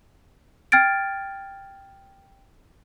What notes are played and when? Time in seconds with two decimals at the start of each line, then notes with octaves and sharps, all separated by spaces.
0.72 G5 F6 G#6 A6 D7